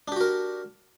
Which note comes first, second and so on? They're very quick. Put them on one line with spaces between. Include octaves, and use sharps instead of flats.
D4 G4 F#4 A#4